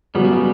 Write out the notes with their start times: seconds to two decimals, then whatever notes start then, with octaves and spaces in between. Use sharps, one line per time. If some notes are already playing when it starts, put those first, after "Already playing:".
0.14 C#3 F#3 G3 B3
0.25 G3
0.32 A3
0.36 G3